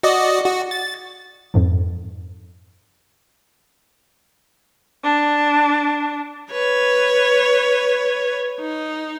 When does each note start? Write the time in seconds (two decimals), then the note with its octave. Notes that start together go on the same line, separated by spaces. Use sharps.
0.03 F#4 D5 D#5
0.45 F#4
0.71 A6
1.54 F2 G#2 F3
5.03 D4
6.51 B4 C#5
8.60 D#4